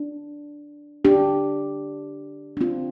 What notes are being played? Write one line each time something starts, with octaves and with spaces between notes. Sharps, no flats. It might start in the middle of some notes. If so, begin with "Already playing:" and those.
Already playing: D4
D4 G4
D4
C4 F4